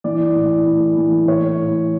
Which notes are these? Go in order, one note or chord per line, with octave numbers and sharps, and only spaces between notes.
E3 D5
A2
A2
E3
E3 C#5
A2